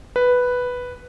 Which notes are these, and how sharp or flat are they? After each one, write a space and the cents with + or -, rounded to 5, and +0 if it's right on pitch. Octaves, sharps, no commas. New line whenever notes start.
B4 +0